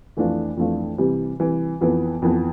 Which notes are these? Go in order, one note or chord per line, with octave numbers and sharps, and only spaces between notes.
F2 E3 A3 D4 F4
F2 E3 A3 D4 F4
C3 E3 G3
C3 E3 G3
F2 E3 B3
F2 E3 B3